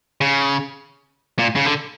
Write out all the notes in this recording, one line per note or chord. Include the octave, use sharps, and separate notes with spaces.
C#3
A#2
C#3
D3